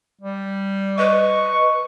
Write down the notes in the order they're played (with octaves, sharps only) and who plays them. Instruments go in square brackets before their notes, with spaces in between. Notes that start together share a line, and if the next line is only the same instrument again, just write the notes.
[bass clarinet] G3
[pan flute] B4 [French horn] D#5 [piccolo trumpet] C#6